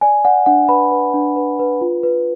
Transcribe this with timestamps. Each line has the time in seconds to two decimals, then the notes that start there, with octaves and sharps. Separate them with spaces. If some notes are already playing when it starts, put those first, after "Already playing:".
0.01 D5 G#5
0.25 D5 F#5
0.46 D4 F#5
0.69 B4 B5
0.92 B4
1.14 D4
1.36 B4
1.59 B4
1.81 F4
2.03 B4